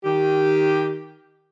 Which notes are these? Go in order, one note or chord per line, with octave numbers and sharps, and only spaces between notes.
D#3 G4